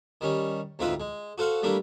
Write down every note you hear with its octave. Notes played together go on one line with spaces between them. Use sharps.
D#3 G3 C#4
D2 G#2 C4 F4 B4 E5
G#3
F#4 A4 C5 F5 F#5
G3 A3 A#3 D4 E4